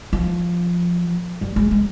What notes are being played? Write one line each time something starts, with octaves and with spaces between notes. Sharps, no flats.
F3
G3
G#3
G#3